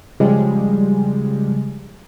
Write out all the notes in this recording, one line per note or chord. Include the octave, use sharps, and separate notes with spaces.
C#3 F3 G3 G#3